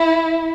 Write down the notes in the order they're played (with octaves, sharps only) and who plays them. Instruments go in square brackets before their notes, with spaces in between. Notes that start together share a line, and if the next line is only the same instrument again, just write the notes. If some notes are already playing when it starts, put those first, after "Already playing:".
Already playing: [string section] E4